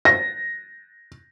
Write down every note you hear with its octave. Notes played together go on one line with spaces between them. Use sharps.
A#6